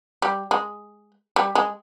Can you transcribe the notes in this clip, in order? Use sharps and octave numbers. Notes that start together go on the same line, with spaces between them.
G3
G#3
G3
G#3